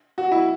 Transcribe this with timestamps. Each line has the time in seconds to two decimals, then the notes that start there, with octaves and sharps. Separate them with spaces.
0.18 F#4
0.32 E4